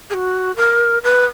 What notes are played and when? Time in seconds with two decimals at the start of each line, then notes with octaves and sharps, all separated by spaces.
0.10 G#4
0.13 F#4
0.56 A#4
1.03 B4